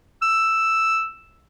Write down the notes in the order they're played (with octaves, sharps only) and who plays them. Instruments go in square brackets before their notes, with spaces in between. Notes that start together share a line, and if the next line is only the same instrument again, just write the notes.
[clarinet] E6